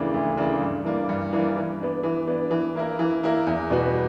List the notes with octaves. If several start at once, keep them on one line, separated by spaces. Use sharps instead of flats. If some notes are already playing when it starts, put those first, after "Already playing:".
Already playing: D2 C#3 E3 A#3 D4
D2
C#3 E3 A#3 D4
G2
E3 A#3 D4
G2
E3 A#3 D4
E3
B3 D4
E3
B3 D4
E3
A#3 E4 A#4
E3
A#3 E4 A#4
E2
B2 G3 B3 F#4